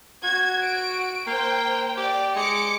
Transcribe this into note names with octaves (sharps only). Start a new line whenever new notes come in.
F#4 G#6
D7
A#3 C5 G5
G4 D5
G#3 D6 C#7